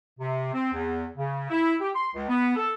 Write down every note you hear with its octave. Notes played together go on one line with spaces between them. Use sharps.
C3
C4
E2
C#3
E4
G4
C6
C#2
B3
A4